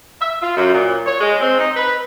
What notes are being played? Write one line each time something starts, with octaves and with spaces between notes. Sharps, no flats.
E5
F4
F#2
A#2
C#5
G#3
C4
D#4
B4